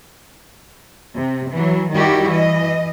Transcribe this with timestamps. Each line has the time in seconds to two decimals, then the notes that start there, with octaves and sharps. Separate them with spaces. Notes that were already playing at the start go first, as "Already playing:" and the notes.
1.16 C3
1.52 E3 F#3
1.93 D#3 G3 E4 F#4 G4
2.30 E3 D#5